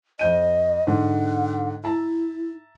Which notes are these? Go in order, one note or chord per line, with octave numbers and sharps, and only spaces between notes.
F2 D#5 G6 D#7
G#2 D3 F#5
E4 E5 A5 A#5